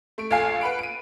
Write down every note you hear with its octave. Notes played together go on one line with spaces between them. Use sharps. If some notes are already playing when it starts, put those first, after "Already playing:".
A3 D7
A#1 A4 F5 G#5 C7
B4 F#5 B5 D7
D7 D#7